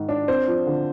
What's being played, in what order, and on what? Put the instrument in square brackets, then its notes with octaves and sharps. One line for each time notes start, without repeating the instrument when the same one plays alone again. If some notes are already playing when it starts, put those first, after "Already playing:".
Already playing: [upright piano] G#2 D#3
D4
C4 C5
F3
D3